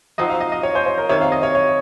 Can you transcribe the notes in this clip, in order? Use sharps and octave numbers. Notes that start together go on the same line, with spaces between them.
F3 C4 D#4 F#4 D#5
F5
D#5
D#5
C#5
C5
C5
A#4
C3 D#3 A#3 C#5
F5
D#5
C#5
C#5